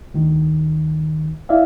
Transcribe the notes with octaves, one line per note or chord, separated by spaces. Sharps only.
D2 D#3
E4 D5 E5 F5